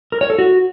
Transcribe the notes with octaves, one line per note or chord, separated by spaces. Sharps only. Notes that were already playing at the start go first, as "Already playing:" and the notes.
A#4
C#5
A4
F#4